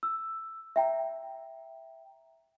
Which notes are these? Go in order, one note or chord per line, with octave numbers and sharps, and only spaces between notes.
E6
E5 G5 A#5